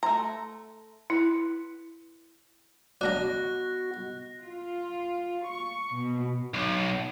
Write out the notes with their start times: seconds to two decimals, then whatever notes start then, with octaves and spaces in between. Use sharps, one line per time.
0.03 A3 A#5 C6
1.10 E4 B4
3.01 F#3 B3 D4 F#4 D5 D#5 F#6 A#6
4.43 F4
5.46 C#6
5.94 B2
6.54 B1